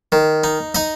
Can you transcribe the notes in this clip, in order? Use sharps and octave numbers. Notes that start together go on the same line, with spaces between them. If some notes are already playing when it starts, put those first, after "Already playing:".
D#3
D#4
D#4 D#5